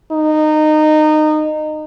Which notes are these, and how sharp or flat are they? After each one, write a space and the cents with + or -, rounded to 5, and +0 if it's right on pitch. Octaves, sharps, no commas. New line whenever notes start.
D#4 -20